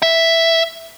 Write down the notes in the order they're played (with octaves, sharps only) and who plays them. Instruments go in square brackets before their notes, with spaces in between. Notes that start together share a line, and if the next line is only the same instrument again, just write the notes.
[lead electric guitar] E5